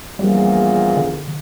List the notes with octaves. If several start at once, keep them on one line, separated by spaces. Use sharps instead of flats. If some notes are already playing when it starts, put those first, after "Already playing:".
A#1 E2 A#2 G3
D3